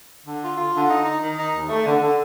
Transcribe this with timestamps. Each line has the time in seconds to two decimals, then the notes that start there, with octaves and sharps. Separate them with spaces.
0.24 D3
0.41 F4
0.56 F4
0.73 D3
0.89 D#4
1.04 D#4
1.20 D#3
1.37 D#4
1.53 D#2
1.68 A3
1.85 D3
2.00 D3